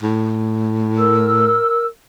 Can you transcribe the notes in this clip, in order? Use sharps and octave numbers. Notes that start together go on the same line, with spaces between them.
A2
A#4 E6